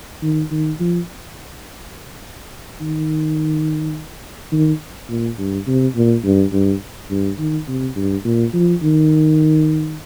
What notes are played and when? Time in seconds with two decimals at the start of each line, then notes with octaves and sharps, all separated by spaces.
0.22 D#3
0.51 D#3
0.80 F3
2.81 D#3
4.52 D#3
5.09 A#2
5.38 G2
5.67 C3
5.96 A#2
6.24 G2
6.53 G2
7.11 G2
7.39 D#3
7.68 C3
7.96 G2
8.25 A#2
8.54 F3
8.83 D#3